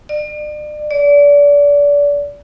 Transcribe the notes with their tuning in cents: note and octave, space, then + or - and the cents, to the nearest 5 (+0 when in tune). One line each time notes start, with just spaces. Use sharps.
D5 +40
D5 -30